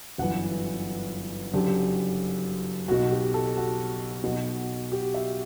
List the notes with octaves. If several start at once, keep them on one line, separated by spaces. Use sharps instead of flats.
G1 F#2 E3 F#5
F#1 F#2 D3 G4
B1 B2 F#4
G4
A4
F#4
B1 B2
G4
E5